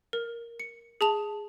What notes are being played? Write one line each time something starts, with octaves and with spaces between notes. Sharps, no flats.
A#4
C#7
G#4 A5 F7